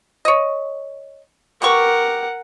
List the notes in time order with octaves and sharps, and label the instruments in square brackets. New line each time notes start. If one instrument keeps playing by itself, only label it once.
[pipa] C#5 D#5
[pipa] B2 G4 C#6 [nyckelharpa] A#4 F#5